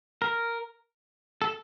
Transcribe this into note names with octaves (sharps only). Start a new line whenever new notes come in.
A#4
A4